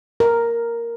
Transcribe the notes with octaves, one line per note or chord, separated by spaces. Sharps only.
A#4